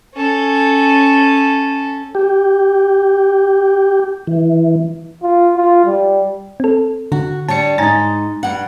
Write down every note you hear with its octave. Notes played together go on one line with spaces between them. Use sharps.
C#4 A4
G4
E3
F4
F4
G3
C4 A4
D3 F#4
G3 D4 C#5 A5 C#7
G#2 D#4 G#5 A#5 A6
G2 F#5